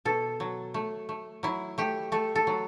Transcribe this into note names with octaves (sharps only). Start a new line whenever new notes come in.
B2 A4
F#3
A3
A3
F#3 E4
A3 G4
A3 A4
A4
F#3